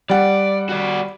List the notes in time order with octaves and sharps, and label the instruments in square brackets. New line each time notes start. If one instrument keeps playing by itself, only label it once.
[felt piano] G3 F#5 [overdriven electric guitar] D5
[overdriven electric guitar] F#4 D5